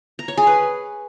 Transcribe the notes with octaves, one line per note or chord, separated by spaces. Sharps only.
A#5
C#5
G#4
B4